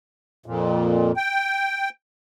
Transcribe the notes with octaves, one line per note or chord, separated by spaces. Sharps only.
F2 A#2
G5